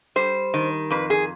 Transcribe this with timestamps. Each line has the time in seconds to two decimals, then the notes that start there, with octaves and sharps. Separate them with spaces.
0.16 G3 C5
0.54 D#3
0.90 F2 B4
1.10 G#4